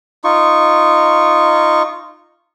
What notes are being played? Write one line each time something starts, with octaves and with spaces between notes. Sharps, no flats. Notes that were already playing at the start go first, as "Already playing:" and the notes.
D#4 F4 C#6